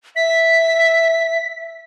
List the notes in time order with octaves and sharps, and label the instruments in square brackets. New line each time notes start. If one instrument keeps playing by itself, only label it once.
[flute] E5 [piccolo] B6